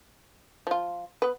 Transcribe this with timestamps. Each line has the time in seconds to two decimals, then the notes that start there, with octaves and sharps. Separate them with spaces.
0.67 F3 F4
1.22 B3 B4